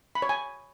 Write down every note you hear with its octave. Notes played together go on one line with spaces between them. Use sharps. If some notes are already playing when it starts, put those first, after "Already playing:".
B5
C#5
G#5